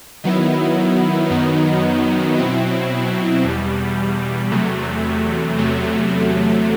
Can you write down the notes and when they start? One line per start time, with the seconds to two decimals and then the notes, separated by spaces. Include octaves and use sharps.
0.24 D#3 F#3 B3 E4
1.30 F#2 D#3 F#3 B3 D#4
2.37 B2 F#3 C4 E4
3.44 E2 B2 G3
4.51 E2 C3 F#3 A3
5.58 E2 C3 F#3 A3